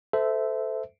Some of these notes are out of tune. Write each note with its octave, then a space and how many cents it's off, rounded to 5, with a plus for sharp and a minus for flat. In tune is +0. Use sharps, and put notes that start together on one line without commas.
A4 +0 C5 -25 E5 -5